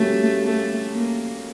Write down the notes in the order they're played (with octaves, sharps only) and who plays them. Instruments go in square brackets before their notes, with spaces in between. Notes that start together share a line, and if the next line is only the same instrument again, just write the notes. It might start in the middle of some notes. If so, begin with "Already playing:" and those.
Already playing: [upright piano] G3 A#3 C#4 F#4 [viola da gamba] A3
[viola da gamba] A3
A#3